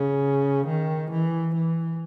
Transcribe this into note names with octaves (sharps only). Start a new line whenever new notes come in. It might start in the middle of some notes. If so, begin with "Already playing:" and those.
Already playing: C#3
D#3
E3
E3